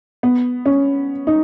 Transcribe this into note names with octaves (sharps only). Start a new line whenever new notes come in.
B3
C#4
D#4